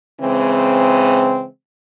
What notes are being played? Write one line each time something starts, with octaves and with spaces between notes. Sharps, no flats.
C#3 E3 G#3 C4